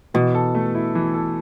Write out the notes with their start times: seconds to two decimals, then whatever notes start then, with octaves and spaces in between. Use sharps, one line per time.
0.14 B2 E3
0.35 A4
0.55 A3
0.75 E4
0.95 E3
1.14 A4